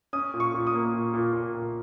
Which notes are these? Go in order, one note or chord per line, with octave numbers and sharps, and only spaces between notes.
C#4 D#6
A#2
C#6
A#2
D#6
A#3
A#2
A#2
A#2
A#2